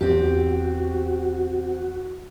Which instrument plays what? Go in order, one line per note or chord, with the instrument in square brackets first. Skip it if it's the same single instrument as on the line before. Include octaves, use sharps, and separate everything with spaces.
[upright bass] E2 [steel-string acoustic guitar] C4 G4 [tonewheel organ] F#4